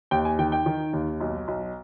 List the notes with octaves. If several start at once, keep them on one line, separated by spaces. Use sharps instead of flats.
D#2 G5
G#5
D#3 G5
G5
D#3
D#2
B1
B1